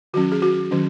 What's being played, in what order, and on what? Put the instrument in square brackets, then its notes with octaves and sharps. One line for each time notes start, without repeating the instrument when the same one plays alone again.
[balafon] D#3 F#3 C#4 F#4
G#4
F#4
D#3 F#3 C#4